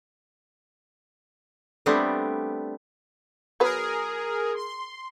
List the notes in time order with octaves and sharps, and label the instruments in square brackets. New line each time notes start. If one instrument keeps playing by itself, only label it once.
[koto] G3 A3 B3 C4 D4
[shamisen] F#3 B3 B4 [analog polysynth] G#4 A#4
[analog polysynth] C6